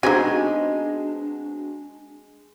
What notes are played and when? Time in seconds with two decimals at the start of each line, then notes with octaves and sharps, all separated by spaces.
0.03 G#3 B3 C4 D4 D#4 F#4 G4 G#5